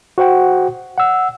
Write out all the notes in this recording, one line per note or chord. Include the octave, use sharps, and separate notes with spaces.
F#4 C5 F#5 G5
F#5 E6